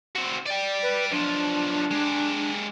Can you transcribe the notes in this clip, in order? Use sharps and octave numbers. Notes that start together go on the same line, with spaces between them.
C4 F#4
D5 G5
B4
B1 F3 D4
G#3 G4